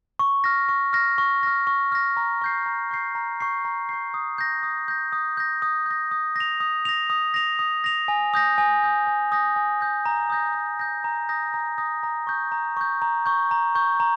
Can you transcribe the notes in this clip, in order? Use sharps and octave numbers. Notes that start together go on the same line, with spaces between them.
C#6
F6 A#6
C#6
F6 A#6
C#6
F6 A#6
C#6
F6 A#6
A#5
C#6 G6 C7
A#5
C#6 G6 C7
A#5
C#6 G6 C7
A#5
C#6 G6 C7
D#6
G6 A#6
D#6
G6 A#6
D#6
G6 A#6
D#6
G6 A#6
D#6
A#6 F7
D#6
A#6 F7
D#6
A#6 F7
D#6
A#6 F7
G#5
D#6 G6 A#6
G#5
D#6 G6 A#6
G#5
D#6 G6 A#6
G#5
D#6 G6 A#6
A#5
D#6 G6 A#6
A#5
D#6 G6 A#6
A#5
D#6 G6 A#6
A#5
D#6 G6 A#6
A#5
C#6 G6
A#5
C#6 G6
A#5
C#6 G6
A#5
C#6 G6
A#5